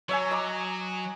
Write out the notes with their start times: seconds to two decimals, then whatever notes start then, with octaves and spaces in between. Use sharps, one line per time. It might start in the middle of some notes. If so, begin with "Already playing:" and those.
0.09 F#3 C#5 E5 G#5
0.31 D#5 A#5 D6